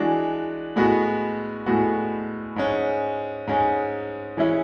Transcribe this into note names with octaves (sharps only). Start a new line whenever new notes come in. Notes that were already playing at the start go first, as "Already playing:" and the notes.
Already playing: E3 G#3 D4 F#4
A2 G#3 B3 F#4
A2 G#3 B3 F#4
G#2 G#3 C#4
G#2 G#3 C#4
E3 G#3 C#4 E4